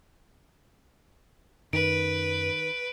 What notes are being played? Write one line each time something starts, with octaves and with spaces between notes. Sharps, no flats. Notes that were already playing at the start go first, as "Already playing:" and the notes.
F#2 D#3 B4 D7